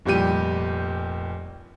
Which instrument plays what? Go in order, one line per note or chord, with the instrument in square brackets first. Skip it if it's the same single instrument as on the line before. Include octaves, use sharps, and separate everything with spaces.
[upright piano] F1 A#2 G3 G4 D#7